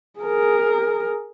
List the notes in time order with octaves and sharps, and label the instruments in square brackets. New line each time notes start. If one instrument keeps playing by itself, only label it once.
[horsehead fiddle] G#4 A#4